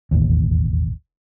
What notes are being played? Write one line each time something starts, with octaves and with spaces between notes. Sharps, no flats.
E1 A1 D#2